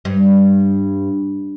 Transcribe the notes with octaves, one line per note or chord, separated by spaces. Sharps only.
G2